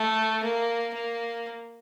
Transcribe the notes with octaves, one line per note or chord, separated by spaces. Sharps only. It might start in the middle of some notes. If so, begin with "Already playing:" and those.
Already playing: A3
A#3
A#3